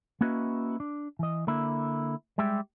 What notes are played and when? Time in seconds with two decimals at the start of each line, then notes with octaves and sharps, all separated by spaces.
0.21 A#3 C#4 E4 F#4 B4 D#5
0.80 D4
1.19 E3 D#5
1.47 D3 A#3 E4
2.38 G3 G#3 G4 E5